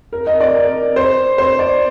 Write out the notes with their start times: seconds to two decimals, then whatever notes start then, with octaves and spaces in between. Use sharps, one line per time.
0.13 A#4
0.27 D#5
0.41 D5
0.54 A#4
0.96 C5
1.38 C5
1.59 D5